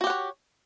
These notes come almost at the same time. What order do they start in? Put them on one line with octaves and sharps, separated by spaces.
F#4 G4 F#5 C#5